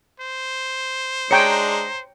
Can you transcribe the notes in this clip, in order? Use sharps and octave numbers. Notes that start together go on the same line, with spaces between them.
C5
G#3 D4 C#5 G5 A#5 C#7